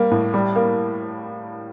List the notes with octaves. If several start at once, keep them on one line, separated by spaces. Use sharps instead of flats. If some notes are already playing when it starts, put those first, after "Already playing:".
Already playing: G3 A#3
A2
G3
A#3